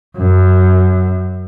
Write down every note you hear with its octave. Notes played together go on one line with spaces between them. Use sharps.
F#2